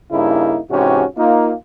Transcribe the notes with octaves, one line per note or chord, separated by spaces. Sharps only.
G2 C#3 A#3 D#4 E4
G#2 C3 E3 C#4 F#4 G4
A#3 D#4 F4